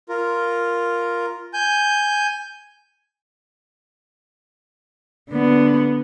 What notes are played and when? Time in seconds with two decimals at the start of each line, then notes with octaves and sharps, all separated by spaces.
0.09 F4 A#4
1.53 G#5 G6
5.30 D3 B3